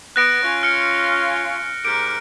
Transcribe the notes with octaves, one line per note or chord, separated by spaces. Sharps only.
B3 F#6 A#6 D7
C#4 F4
F6 C#7
G#2 G4 A#4 D7